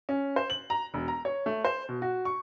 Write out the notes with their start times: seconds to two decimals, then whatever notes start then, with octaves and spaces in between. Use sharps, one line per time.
0.09 C#4
0.36 C5
0.50 F#7
0.70 A#5
0.94 E1
1.08 A#5
1.25 C#5
1.46 A3
1.65 C5
1.89 B2
2.02 F#4
2.25 C#6